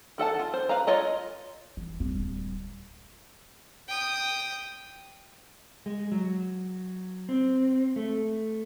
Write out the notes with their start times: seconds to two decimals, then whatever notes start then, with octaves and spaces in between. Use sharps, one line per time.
0.18 D#3 A4 F#5 A5
0.39 F4
0.54 C5
0.69 B4 F5 A#5
0.87 F4 C#5 D#5 A#5
1.77 E3
2.00 D1 G3
3.88 G5 D#6
5.86 G#3
6.12 F#3
7.29 C4
7.96 A3